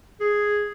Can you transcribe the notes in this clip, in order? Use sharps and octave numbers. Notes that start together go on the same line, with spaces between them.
G#4